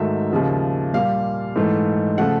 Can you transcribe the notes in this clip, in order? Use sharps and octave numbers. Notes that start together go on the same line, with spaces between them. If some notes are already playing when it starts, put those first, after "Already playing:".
Already playing: G#2 D#3 F#3 A3 E5
D#2 C#3 F3
A#2 G3 F5
G#2 E3 A3
C#3 F3 A3 F#5